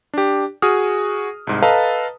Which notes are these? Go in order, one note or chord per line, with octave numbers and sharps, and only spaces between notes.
D4 G4
F#4 G#4 D#6 F6
C2 G#2
A4 B4 D#5 F5 A5 A#5